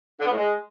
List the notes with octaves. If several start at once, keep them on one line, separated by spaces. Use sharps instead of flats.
D3
B3
A2
G#3